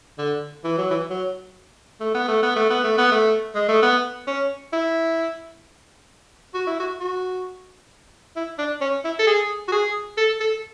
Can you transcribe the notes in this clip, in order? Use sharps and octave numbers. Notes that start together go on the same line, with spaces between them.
D3
E3
F#3
E3
F#3
A3
B3
A3
B3
A3
B3
A3
B3
A3
G#3
A3
B3
C#4
E4
F#4
E4
F#4
F#4
E4
D4
C#4
E4
A4
G#4
F#4
G#4
A4
A4